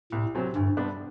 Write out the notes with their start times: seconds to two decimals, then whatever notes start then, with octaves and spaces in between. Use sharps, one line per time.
0.12 C2 A2
0.35 C3 F#3 C4
0.55 D2 G2
0.77 C3 G3 B3 D4